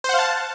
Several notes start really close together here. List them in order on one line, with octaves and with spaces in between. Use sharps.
C5 F#5 F5 A5